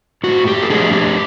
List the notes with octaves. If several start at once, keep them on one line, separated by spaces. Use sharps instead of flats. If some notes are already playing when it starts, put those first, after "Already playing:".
A2 F#4
G4
A4
F3 A3 D4 G#4
G4